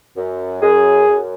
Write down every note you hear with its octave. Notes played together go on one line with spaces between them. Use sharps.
F#2
F#2 G#4
F#2